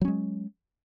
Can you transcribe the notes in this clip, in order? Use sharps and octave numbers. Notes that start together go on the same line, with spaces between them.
F#3 G#3 C#4